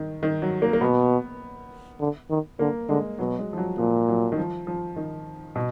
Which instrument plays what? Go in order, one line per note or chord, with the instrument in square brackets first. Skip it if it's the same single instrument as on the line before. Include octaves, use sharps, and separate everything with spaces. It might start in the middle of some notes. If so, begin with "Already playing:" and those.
Already playing: [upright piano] D#3
D#3
F#3
A#3
A#3
[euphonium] B2 [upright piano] B3
[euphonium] D3
D#3
[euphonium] D3 [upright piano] A#3
[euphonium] D3 [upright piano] G#3
[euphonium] B2 [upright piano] F#3
[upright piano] G#3
F3
F#3
[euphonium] A#2 [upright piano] F3
[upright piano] F#3
D#3
F3
F3
D#3
B2